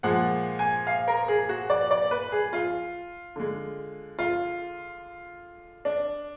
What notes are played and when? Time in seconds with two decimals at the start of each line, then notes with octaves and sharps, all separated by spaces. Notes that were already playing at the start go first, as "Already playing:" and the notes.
0.03 A#2 F3 G#3 F#5
0.59 G#5
0.87 F5
1.08 A#4
1.28 G#4
1.49 F#4
1.70 D5
1.91 D5
2.11 B4
2.32 G#4
2.53 F4
3.36 D3 G#3
4.19 F4
5.85 D4